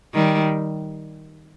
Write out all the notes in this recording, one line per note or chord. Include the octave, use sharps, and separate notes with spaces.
D#3 G3